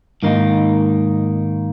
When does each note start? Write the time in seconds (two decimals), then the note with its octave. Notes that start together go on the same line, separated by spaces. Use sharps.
0.23 G#2 D#3 A#3 D#4